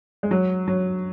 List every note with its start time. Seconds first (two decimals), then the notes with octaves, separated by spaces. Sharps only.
0.23 G#3
0.31 F#3
0.68 F#3